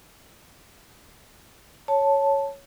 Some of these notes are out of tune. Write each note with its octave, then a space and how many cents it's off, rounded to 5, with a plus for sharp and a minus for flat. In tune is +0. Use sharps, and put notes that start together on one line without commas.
C#5 +0 A5 +0